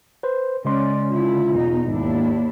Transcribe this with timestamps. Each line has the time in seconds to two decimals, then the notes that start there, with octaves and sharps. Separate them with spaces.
0.23 B4 C5
0.65 C#3 G#3 C#4 D5 C6
1.09 D3 E4 F4
1.52 E2 B2 D#4
1.87 G#1 D#2 G#2 D4 E4